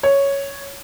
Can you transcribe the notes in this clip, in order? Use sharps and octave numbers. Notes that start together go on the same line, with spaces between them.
C#5